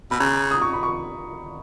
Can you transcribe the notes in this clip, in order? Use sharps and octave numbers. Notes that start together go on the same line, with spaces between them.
B2 B5
C#3 A#5
D#6
C#6
B5
C#6